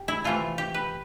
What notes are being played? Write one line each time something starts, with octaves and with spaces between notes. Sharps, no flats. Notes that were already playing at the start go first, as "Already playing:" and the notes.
Already playing: G4
E4
C3 E3 A3 F4
G4
B4